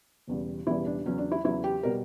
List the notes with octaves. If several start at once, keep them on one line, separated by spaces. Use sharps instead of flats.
E1 E2 C#3 E3 G3
E1 E2 C#3 E3 G3 E4
D4
E2 C#3 F#3 C#4
D4
E4
E2 C#3 F#3 E4
G4
B2 G3 A#4